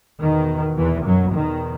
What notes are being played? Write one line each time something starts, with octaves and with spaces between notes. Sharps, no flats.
E2 B2 D#3
E2 E3
F#2 F#3
E2 B2 D#3